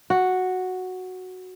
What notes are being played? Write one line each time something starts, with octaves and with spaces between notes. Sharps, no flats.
F#4